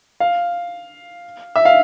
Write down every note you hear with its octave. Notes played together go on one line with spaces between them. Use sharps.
F5
E5
F5